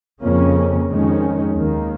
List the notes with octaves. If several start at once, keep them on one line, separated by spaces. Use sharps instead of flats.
F2 C#3 A#3 C#4
F2 D#3 G#3 C#4
D#2 D#3 A#3